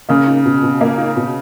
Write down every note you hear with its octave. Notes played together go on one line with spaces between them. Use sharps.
C#3 A#3
D#4
B2
B2
A#3
D#4
B2